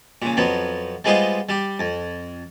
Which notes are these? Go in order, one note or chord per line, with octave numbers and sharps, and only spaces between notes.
A#2 C#3
F2 F3 F#3 B3
G3 G#3 B3 F4 C5 D#5
G3 G4
F2